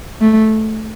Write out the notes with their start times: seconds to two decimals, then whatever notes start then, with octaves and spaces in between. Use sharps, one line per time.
0.21 A3